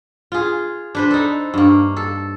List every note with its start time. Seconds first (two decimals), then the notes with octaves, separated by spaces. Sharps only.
0.32 F4 G#4
0.95 D4 B4 C5
1.11 D#4 A4
1.54 G2 A#3
1.97 A4